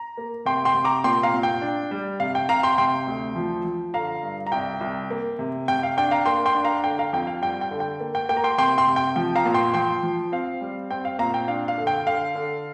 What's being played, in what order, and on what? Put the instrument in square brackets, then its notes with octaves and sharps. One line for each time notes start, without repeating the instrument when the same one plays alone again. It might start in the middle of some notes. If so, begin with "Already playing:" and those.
Already playing: [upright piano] A#5
A#3
C3 G5 C6
G5 C6
C3
A#5 D6
A#2 G5 C6
F5 A#5
A#2
G5
D4
G3
C3 F5
G5
C3 F5 A#5
G5 C6
C3 G5 C6
D2
F3
F3
D3 F5 A#5
G2
A#5
C2 G5
C2
A#3
C3
C3 G5
F5
D4 G5
F5 A#5
A#3 G5 C6
G5 C6
D4
F5 A#5
D3 G5
F5 A#5
F2 G5
F5
G3 G5
G5
D3
G5
A#3
G5
A#3 G5
A#5
G5 C6
C3 G5 C6
G5 C6
C3
G5
F3 G5
F5 A#5
A#2
G5 C6
F3 G5 C6
F3
C4 F5
G3
C4 G5
F5
A#2 F5 A#5
G5
D4 F5
F5
D3
G5
D3 F5
D3